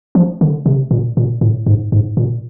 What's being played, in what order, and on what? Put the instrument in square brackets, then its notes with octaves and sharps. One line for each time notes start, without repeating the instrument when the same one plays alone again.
[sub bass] F3
D3
C3
A#2
A#2
A2
G#2
G#2
A#2